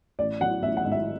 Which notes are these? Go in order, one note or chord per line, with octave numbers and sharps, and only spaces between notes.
A1 D5
F#3 F#5
A1 E5
F#5
G#2
E5